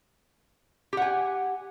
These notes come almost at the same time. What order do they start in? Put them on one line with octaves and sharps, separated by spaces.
G4 F#5 G#5